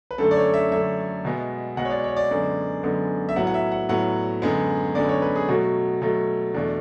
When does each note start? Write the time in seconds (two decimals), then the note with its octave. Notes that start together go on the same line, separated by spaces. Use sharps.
0.11 B4
0.18 F#2 D3 A3 A4
0.31 D5
0.37 C#5
0.54 E5
0.71 F#2 D3 A3 E5
1.25 B2 G#3 B3
1.77 B2 G#3 B3 F#5
1.85 C#5
1.90 D5
2.04 C#5
2.17 D5
2.31 F#2 D3 G#3 B3
2.83 F#2 D3 G#3 B3
3.29 E5
3.36 A2 F#3 B3 F#5
3.47 F#5
3.54 E5
3.72 F#5
3.89 A2 F#3 B3 F#5
4.42 F#2 D3 G#3 B3
4.95 F#2 D3 G#3 B3 D5
5.09 C#5
5.22 B4
5.36 G#4
5.48 B2 F#3 A3 F#4
6.02 B2 F#3 A3
6.54 E2 B2 A3 D4